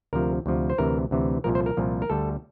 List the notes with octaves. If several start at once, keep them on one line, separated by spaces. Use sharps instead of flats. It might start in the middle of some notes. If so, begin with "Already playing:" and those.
D2 C3 F3 A#4
D2 C3 F3
C5
D2 C3 E3 A#4
D2 C3 E3
C2 A#2 F3 A#4
C5
A#4
C2 A#2 F3
A#4
D2 D3 G3 A4